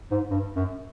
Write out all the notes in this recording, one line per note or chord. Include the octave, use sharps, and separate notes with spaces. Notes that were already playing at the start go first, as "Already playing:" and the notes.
G#2
G2
F#2